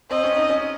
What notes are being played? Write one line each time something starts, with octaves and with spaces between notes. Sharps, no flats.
C4 D#5
C#4
D#4
C#4